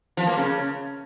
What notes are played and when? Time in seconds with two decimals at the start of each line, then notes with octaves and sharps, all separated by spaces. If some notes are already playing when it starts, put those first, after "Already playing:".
0.17 F3
0.27 A#3
0.37 C#3